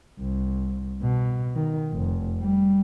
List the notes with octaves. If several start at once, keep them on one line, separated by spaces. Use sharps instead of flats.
C2
B2
D#3
F1
G3